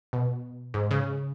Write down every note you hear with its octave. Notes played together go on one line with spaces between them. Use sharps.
B2
G#2
C#3